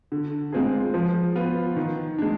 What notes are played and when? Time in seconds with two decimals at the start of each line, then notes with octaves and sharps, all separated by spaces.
0.12 D3
0.53 G#3 C4 F4 G#4
0.94 F3
1.36 B3 F4
1.76 D#3
2.18 G#3 D4